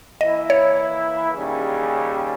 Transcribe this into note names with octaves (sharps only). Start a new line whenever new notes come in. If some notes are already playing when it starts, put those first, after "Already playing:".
E3 A#3 E4 D#5
C#5
D#2 C#3 G3 C#4 G#4